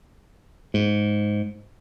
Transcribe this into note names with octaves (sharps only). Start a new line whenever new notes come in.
G#2